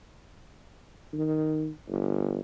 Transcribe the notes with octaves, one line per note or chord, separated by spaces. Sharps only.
D#3
G1